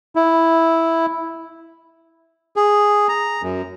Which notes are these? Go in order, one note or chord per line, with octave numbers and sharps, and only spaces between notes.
E4
G#4
A#5
F#2